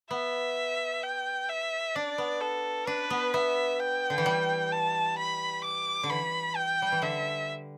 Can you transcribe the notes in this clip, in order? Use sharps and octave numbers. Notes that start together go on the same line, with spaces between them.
B3 E5
G5
E5
D4 D5
B3
A4
D4 B4
B3
B3 E5
G5
D3
E3
G3
A5
B5
D6
D3
E3 B5
G5
G3
E3
D3 E5